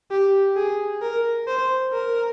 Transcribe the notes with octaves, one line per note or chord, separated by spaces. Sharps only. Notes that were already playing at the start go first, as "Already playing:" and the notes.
G4
G#4
A#4
C5
A#4